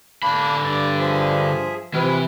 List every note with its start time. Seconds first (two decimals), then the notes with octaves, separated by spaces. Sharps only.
0.23 D3 A#3 D4 B5
0.64 G2 D5
0.99 F3 G#4 E5
1.94 C3 E3 F3 B4